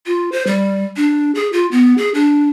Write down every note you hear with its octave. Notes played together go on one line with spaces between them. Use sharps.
F4
C5
G3
D4
G#4
F4
B3
G#4
D4